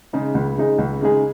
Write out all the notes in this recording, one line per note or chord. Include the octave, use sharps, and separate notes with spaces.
C#3 G#3 D#4 G#4
C#2
C#3 G#3 D#4 G#4
C#2
C#3 G#3 D#4 G#4